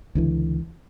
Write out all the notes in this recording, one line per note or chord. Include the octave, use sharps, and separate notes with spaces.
C#2 D3 E3